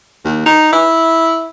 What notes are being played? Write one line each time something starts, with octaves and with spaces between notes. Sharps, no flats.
D#2
D#4
E4